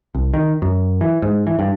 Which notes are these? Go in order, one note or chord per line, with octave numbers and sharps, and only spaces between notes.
C2
D#3
F#2
E3
G#2
E3
G2